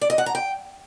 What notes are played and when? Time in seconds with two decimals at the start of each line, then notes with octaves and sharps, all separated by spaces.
0.01 D5
0.10 D#5
0.18 F#5
0.26 A#5
0.35 G5